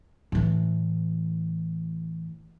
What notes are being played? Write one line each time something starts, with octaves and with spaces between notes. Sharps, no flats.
A2 E3